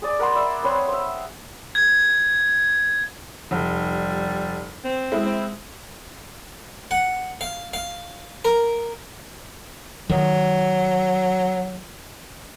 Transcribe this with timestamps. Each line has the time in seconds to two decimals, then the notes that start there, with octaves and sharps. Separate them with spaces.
0.02 G#4 D5
0.19 A#4 F#5 B5 C6
0.35 D5 E5
0.63 C4 B4 C#5
0.88 C5 E5
1.75 G#6
3.51 F1 G3
4.84 C4
5.12 G#3 E4
5.26 C4
6.91 F#5
7.41 F5
7.74 F5
8.45 A#4
10.10 D#3 F#3